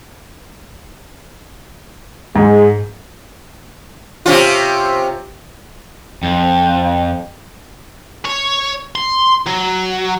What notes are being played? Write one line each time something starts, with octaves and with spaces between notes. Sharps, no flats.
G#2 G#3
C3 C#4 F4
F2
C#5
C6
F#3